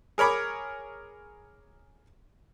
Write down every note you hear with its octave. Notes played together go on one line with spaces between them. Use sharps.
G#4 A#4 C#5 B5 D6